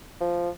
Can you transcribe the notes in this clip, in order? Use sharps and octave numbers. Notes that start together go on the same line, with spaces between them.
F3